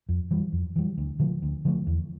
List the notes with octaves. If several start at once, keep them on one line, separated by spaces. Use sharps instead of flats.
F2
E3 G3
F2
E3 G3
D2
D3 F3 A3
D2
D3 F3 A3
E2